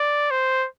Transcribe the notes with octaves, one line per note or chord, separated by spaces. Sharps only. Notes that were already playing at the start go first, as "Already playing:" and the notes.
Already playing: D5
C5